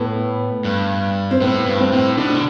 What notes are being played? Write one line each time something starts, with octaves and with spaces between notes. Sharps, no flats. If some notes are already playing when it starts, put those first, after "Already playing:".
Already playing: A2 B3
G2
C4
A2 B3
G2
C4
A2
B2 D4
D3